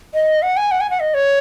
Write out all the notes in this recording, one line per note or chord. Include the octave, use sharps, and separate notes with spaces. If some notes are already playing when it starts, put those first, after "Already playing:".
D#5
F#5
G#5
F#5
G#5
F#5
D#5
C#5